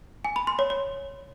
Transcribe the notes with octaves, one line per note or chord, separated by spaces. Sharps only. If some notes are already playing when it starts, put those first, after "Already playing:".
G#5
B5
C6
C#5
C#5